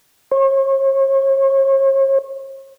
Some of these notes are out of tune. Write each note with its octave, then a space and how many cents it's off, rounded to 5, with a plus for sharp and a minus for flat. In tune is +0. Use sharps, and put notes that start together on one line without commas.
C#5 -40